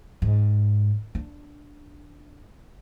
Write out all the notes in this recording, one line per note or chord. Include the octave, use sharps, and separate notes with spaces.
G#2
D4